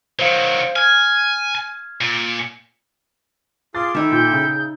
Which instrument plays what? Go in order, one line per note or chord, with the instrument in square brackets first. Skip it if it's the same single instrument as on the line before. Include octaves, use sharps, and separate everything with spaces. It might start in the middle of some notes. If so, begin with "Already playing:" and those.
[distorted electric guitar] D#3 F#3 [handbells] C5 F5
[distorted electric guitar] G#5 [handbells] F6 G#6
[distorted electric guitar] A#2
[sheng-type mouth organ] F4 G#4 C6 [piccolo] D6 [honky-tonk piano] A6
[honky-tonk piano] D#3 [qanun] D#4 E5 [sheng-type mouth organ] E4 A4 G5
[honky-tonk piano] A#2 [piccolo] G6
[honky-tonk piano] C#3